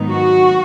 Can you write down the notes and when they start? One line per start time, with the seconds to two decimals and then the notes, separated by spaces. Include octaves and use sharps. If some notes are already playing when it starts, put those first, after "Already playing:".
Already playing: G#2 D#3 F#3 B3 D#4
0.08 F#4